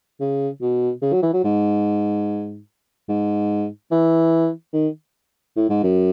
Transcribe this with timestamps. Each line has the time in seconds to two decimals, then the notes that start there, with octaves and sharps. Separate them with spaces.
0.20 C#3
0.62 B2
1.02 C#3
1.13 F#3
1.22 E3
1.33 F#3
1.44 G#2
3.09 G#2
3.91 E3
4.73 D#3
5.56 A2
5.70 G#2
5.83 F#2